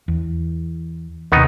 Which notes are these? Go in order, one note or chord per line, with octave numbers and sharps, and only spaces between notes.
E2
D#2 C3 D#3 B3 D#4